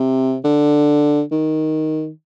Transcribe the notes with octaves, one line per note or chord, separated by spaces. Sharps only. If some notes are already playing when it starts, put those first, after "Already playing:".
Already playing: C3
D3
D#3